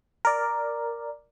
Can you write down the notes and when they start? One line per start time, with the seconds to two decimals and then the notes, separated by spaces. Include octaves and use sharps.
0.25 A#4 D5